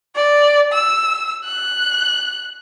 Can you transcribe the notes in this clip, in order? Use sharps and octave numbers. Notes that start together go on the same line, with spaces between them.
D5
E6
F#6